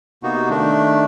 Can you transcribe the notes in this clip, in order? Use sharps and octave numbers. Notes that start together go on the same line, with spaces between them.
C3 A#3 B3 D#4 F#4
D#3 A3 D4